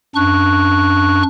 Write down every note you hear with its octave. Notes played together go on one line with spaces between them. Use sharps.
F#2 D4 C#6 F#6